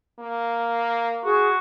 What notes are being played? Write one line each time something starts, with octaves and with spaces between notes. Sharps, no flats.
A#3
F#4 G#4